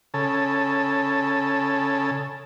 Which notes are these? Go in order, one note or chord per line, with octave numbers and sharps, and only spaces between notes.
C#3 A4